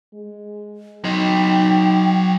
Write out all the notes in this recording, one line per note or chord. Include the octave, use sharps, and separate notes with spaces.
G#3
F#3 D#4 D#5 G5